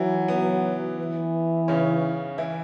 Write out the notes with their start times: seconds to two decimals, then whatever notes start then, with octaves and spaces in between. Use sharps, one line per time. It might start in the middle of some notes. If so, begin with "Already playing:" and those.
Already playing: E3 F#3 E4
0.28 B3
0.98 E3
1.68 C#3 C#4
2.38 E3 E4